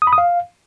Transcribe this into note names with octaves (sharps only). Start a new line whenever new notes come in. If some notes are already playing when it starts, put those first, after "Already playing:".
D#6
B5
D#6
F5